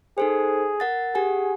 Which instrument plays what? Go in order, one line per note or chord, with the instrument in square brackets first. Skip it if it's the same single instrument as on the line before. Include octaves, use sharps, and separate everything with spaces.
[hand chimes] D#4 A4 C5 [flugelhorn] G#4
[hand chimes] A#4 F#5 A6
[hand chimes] G4 F#5 G#5 [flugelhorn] G#4